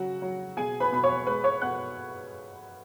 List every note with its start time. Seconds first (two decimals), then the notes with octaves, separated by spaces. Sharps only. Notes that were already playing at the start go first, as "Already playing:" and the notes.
Already playing: C#3 F#3 F#4 F#5
0.22 F#3
0.57 B2 G#4 G#5
0.80 B4 B5
0.92 B2 B5
1.03 C#5 C#6
1.27 G#3 B4 B5
1.44 C#5 C#6
1.62 B2 F#5 F#6